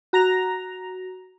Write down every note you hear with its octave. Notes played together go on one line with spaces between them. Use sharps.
F#4 A#5 A#6 F7